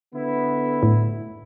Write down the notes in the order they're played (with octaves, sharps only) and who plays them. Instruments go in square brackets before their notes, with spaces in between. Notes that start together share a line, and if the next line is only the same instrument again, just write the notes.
[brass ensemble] D3 B3 E4
[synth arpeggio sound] A2